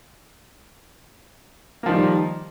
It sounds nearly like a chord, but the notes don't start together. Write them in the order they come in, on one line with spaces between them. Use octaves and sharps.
A#3 F3 D#3 G3